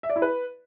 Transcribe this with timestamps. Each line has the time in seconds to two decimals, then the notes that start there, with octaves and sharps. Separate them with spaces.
0.03 E5
0.10 D5
0.16 E4
0.22 B4